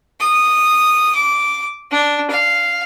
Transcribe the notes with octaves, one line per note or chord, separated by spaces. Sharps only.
D#6
D6
D4
F5